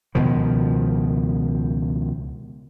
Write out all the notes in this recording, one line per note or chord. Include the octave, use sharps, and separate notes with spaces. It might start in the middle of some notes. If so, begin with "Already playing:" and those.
C#2 B2 D#3 F3